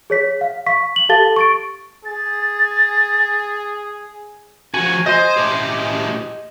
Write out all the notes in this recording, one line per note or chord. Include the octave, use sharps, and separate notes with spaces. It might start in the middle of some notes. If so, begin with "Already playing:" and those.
G#4 C#5 B6
F5
F5 C#6 B6
F#7
G4 A4 F5 A5 A6 G7
C#6 A6 D7
G#4 A6
F3 F#4 G#5
C5 D#5 G#5 C6
A2 G4